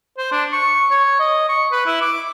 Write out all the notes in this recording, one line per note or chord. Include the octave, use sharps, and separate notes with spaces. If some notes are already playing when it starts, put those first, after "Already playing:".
C5
D4
C#6
C#5
D#5
C#6
B4
E4
D6